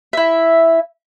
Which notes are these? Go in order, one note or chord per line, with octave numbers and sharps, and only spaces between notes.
E4 E5